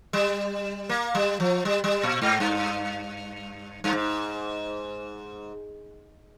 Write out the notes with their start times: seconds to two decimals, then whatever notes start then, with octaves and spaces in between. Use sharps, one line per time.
0.13 G3
0.89 A#3
1.15 G3
1.40 F3
1.65 G3
1.84 G3
2.04 A#2
2.22 G#2
2.40 G2
3.84 G2
3.93 G#2